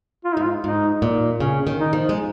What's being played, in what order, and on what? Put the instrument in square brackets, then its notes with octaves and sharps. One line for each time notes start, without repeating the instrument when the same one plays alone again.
[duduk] F4
[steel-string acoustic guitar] G#2 [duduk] D#4
[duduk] F4
[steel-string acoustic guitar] G#2 [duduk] D#4
[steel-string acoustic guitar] A#2
[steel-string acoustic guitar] C#3 [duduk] C#4
[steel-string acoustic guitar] D#3
[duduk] D#4
[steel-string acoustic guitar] F3
G#3